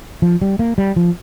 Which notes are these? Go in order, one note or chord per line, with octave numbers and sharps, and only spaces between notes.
F3
G3
A#3
G3
F3